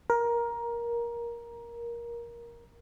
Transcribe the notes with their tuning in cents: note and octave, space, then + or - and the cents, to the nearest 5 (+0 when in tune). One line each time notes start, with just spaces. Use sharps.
A#4 +15